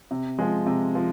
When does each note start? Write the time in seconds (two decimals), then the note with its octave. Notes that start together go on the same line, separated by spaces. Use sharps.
0.11 C3
0.39 F3 G#3
0.66 C3
0.95 F3